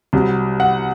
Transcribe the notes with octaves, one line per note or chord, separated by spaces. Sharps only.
C2 C3 F#3
F#5